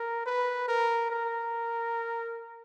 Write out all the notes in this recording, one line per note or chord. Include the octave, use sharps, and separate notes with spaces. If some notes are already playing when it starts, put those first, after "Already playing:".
Already playing: A#4
B4
A#4
A#4